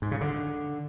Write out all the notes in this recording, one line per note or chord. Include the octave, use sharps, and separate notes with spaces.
G#2
C#3
D3